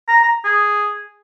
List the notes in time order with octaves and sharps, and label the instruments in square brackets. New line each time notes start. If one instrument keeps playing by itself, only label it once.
[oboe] A#5
A#5
G#4